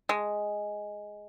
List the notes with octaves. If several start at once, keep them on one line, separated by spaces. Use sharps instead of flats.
G#3